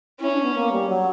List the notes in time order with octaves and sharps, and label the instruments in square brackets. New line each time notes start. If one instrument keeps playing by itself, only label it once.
[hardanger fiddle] C#4 [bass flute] E4
[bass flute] D4
B3
A#3
G3
F#3